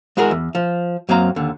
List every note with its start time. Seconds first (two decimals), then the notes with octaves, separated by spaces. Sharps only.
0.17 G#3 E4 F#4 G#4 A#4
0.31 E2
0.55 F3
1.09 F#2 F#3 A#3 C4 F5 A#5
1.36 D#2 D3